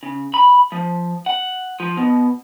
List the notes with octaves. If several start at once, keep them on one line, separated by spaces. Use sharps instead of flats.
C#3
B5
F3
F#5
F3
B2